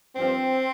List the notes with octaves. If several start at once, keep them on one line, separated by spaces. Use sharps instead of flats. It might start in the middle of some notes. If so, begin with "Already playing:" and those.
G2 F3 C4